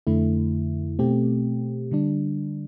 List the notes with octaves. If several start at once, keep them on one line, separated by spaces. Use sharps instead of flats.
F2 D3 A3 E4
B2 A3 C4 G4
D3 G3 D4